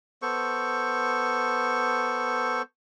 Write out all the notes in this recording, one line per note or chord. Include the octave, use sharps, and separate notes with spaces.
B3 A4 C5 C#6